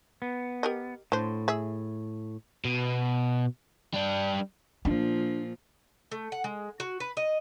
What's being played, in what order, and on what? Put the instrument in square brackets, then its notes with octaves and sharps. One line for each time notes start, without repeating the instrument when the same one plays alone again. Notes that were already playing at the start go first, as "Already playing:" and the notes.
[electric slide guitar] B3
[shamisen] G4 A#4 D#5
[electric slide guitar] A2 [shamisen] D3 C5
[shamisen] G#4 E5
[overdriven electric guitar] B2
G3 D4
[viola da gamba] A#2 F3 [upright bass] D4
[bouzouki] A3
F#5
G#3
F#4
B4
D#5